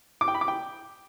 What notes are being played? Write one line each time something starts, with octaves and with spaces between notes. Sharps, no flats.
D6
G5
B5
D6
G5